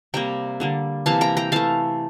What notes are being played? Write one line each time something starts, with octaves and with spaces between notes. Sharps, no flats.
C3 G3 A#3 G5 A#5
D3 G3 A#3
C3 E3 A#3 F5 A5
G5 A#5
G5 A#5
E3 A3 F5 A5